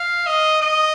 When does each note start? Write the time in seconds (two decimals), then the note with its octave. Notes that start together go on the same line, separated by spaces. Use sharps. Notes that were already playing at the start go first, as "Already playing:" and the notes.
Already playing: F5
0.26 D#5
0.61 D#5